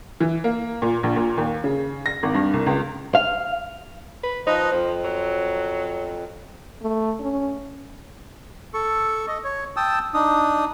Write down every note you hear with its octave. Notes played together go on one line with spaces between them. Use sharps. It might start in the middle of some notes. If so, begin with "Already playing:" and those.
E3
A#3
A#2
A#1
A#2
D#2
C#3
A#6
G#1
G2
C2
C#2
F5
B4
F3 D#4 B4 C5 D#5
F2 F3
F#3
A3
C#4
A4 C#6
D#5
C#5
G5 A5 D#6 E6
D4 D#4 D#6